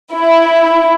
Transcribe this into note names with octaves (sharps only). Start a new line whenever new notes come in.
E4